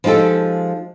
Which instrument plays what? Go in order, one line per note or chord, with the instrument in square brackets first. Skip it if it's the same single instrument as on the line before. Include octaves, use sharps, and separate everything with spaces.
[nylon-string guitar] F3 G#3 D#4 G4 A4